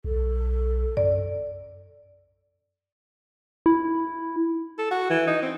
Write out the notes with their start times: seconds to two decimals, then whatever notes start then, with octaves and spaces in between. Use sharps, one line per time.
0.04 B1 A4
0.97 F#2 D5
3.66 E4
4.78 A4
4.91 F#4
5.10 E3
5.27 D#4
5.42 C4